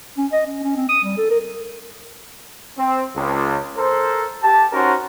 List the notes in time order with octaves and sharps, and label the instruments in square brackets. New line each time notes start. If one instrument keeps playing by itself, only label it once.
[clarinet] C#4
D#5
C#4
C#4
C4
D#6
G3
A4
A#4
[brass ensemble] C4
C#2
A4 A#4 C5
G4 A5
C#4 D#4 F#4 A#4 C5